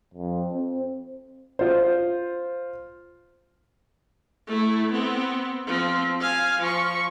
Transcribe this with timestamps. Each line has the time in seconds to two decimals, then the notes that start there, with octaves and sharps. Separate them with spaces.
0.14 F2
0.53 C4
1.59 F4 C5
4.47 A3 E4
4.92 B3 C4
5.67 F3 C4
6.20 F5 G#5
6.59 F3 C#6